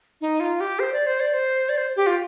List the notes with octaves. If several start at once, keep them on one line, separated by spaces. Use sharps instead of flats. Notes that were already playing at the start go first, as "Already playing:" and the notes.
D#4
F4
G4
C5
D5
C5
D5
C5
D5
C5
G4
F4